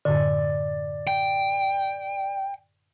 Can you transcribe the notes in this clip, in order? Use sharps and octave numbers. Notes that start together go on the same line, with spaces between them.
F#2 A2 D3 D5
G5